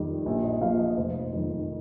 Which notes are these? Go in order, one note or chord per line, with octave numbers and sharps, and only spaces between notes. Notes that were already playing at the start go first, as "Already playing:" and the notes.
Already playing: F2 D#3 G3
A#1
D#5
A#2 F3 F5
D#5
F1 C5
F2 D#3